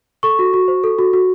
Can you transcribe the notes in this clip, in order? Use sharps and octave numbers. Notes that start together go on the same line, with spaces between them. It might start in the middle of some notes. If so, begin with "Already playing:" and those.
A4 C#6
F#4
F#4
C5
A4
F#4
F#4